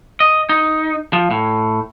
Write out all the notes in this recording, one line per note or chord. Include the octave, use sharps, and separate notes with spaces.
D#5
D#4
F3
A2